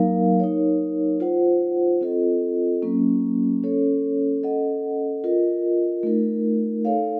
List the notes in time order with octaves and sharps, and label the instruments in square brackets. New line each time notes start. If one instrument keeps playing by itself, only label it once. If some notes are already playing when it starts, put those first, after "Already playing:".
Already playing: [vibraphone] F#3 A#3 D#4 A#4 F5
D#4 A#4 C#5
F4 C5 F#5
C4 F4 A4 D#5
F#3 A#3 C#4
C#4 A4 C#5
C#4 A4 D#5 F#5
F4 A#4 D#5
A3 D#4 A#4
D#4 A4 C#5 F5